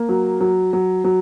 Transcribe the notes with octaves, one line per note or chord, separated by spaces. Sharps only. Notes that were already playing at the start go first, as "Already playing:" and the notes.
Already playing: A#3
F#3
F#3
F#3
F#3